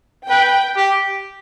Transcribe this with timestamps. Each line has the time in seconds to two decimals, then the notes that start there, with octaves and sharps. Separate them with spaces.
0.29 B4 G5
0.76 G4